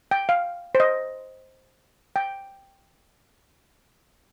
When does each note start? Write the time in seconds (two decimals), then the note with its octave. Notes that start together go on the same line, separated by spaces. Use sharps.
0.11 G5
0.29 F5
0.75 C5
0.80 D#5
2.16 G5